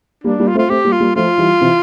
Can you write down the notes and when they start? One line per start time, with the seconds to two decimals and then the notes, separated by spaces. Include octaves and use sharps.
0.24 G3 A#3 D4
0.39 G3 A#3
0.47 F4
0.55 A3 C4
0.58 F4
0.69 A3 C4 G4
0.84 G3 A#3
0.92 F4
1.00 G3 A#3
1.16 F3 A3 F4
1.38 E3 G3
1.61 C3 E3